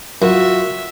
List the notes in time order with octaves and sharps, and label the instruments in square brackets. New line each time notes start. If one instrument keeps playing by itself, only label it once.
[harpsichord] F#2 [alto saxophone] F4 [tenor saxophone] F#4 [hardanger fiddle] E5